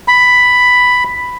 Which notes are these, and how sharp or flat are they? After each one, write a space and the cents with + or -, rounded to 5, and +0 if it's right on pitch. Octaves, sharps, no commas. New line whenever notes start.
B5 +5